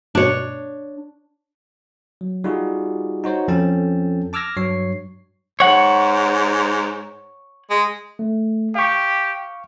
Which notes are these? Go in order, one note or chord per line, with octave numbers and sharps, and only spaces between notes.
G2 B2 D4 C#5
F#3
G3 D#4 F4 F#4 G#4
D#4 F#4 C5 C#5
F2 F3 C#4 A4 G5 A5
A5 D6 E6 F6 G#6 A#6
G2 F#3 C#5 C#6 C7
G#2 C#5 F#5
G#3
A3
G4 F5 C#6